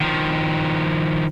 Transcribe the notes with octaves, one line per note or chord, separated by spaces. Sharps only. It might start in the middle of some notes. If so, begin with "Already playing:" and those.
D#3 F3